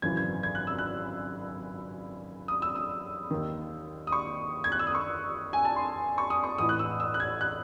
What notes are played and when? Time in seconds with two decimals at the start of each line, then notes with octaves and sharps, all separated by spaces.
0.02 G#1 F#2 C#3 E3 G#6
0.17 G#6
0.43 G#6
0.55 F#6
0.67 E6
0.79 F#6
2.48 D#6
2.62 E6
2.76 D#6
3.31 D#2 D#3
4.07 D#6
4.12 C#6
4.64 G#6
4.72 F#6
4.79 E6
4.87 D#6
4.95 C#6
5.53 G#5
5.65 A5
5.76 C6
6.18 C#6
6.30 D#6
6.44 C#6
6.58 A1 A2 E3 D#6
6.69 F#6
6.79 E6
7.00 E6
7.14 F#6
7.20 G#6
7.41 F#6